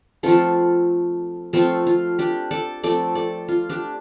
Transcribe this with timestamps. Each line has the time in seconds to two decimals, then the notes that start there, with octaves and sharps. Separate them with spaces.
0.23 F3 A3 C4 F4 A4
1.53 F3 A3 C4 F4 A4
1.87 F4
2.19 D4 G4
2.51 A4 D5
2.83 F3 A3 C4 A4 D5
3.15 A4 D5
3.48 F4
3.69 D4 G4